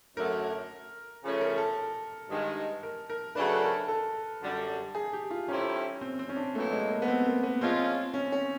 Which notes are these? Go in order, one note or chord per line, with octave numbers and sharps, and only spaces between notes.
F#2 D3 F#3 A3 A#4
C#3 F3 A3 C#4
A#4
A4
G2 D#3 G#3
A#4
A#4
C#3 F#3 A3 D4 B4
A4
A#4
A4
F#2 D3 G3
G#4
G4
F4
D#3 G3 C4 C#4 E4 A4
C4
C4
C#4
D4
A#2 F#3 A3 B3 E4 A4
G#3
A#3
B3
C4
A#3
B3
F3 G#3 C4 C#4 F4
C#4
C#4